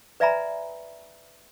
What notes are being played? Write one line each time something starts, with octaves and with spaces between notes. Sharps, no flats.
B4 D5 E5 G#5 A#5 B5